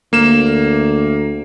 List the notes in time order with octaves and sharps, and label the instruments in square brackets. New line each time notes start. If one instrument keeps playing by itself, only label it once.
[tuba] D2 [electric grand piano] A#3 E7